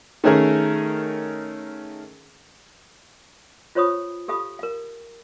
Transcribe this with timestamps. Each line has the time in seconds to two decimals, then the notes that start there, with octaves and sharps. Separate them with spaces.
0.24 D#3 A3 C#4 G#4 A#4
3.75 F4 C5 C#5 B5 C#6 D#6
4.28 G4 A4 F5 B5 D#6
4.59 A#4 F5